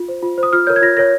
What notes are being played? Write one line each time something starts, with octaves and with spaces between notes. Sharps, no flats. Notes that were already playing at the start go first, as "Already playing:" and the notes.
Already playing: F4
C5
F4
C5
D#6
F4 F6
A#4 C#5 G6
G#6
F4 A#6
A#4 C#5 A#6